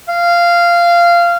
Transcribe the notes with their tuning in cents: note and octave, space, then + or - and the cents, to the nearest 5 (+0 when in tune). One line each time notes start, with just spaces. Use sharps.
F5 -15